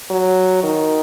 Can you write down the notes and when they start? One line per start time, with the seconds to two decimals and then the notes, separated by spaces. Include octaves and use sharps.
0.10 F#3
0.63 D#3